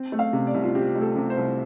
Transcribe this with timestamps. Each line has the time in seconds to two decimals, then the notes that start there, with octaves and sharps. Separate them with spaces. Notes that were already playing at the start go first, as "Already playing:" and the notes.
Already playing: C4
0.12 A3
0.19 F5
0.33 C3
0.47 D5
0.54 C2
0.64 F4
0.75 C4 G4
0.96 A3
1.02 A4
1.16 C3
1.30 C5
1.37 C2